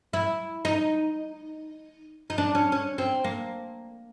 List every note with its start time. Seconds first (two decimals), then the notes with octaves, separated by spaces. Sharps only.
0.13 E4
0.65 D#4
2.30 D#4
2.38 D4
2.55 C#4
2.72 C#4
2.98 C4
3.24 A#3